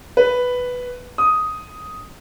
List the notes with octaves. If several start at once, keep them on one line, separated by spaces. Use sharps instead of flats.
B4
D#6